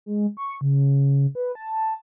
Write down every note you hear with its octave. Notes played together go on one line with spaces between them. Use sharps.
G#3
C#6
C#3
B4
A5